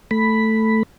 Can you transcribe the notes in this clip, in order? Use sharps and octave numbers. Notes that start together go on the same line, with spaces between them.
A3 B5